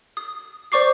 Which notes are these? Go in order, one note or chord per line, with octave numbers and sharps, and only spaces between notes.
D#6
C5 D5 C#6 D6 C7